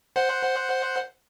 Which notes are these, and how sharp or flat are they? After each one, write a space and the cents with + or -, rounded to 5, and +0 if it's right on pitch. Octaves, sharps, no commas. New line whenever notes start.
C5 +0 F#5 +0